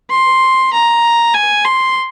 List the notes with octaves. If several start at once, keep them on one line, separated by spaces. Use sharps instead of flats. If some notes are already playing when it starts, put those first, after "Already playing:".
C6
A#5
G#5
C6